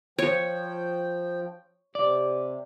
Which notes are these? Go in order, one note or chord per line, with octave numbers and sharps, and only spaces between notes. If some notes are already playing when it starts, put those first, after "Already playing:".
F3 C#5 G5
C3 D5